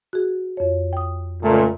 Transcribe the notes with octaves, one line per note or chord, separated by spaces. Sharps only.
F#4 G#4
F2 C#5
G5 D#6
C#2 A#2 A3 A#5